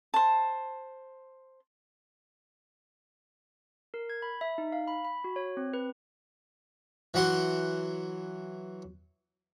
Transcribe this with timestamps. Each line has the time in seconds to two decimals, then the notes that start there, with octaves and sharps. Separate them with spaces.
0.14 C5 A5
3.94 A#4
4.10 G#6
4.22 B5
4.41 E5
4.58 D#4
4.72 F5
4.88 B5
5.05 B5
5.24 F#4
5.36 C#5
5.57 C4
5.74 B4
7.14 E3 F#3 F#5 C6